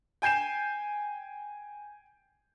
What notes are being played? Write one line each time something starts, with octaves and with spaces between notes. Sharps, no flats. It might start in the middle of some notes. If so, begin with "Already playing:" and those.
G5 G#5 G6 C7 E7